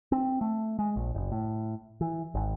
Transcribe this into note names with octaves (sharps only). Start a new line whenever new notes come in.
C4
A3
G#3
A#1
F#1
A2
E3
G#1